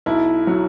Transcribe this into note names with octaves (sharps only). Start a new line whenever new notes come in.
B1 E4
F#3